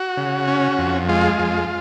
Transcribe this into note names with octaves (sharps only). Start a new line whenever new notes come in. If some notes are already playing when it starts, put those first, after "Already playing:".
Already playing: F#4
C#3
C#4
F2
G#3 F4
F2